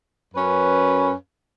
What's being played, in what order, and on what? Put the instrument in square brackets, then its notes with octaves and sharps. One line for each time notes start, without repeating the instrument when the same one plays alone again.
[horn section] F#2 C#4 B4